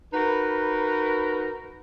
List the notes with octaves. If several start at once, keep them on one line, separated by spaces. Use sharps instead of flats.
D#4 F#4 A#4 B4